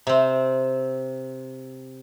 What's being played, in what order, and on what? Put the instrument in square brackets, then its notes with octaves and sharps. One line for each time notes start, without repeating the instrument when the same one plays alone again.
[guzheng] C3 C4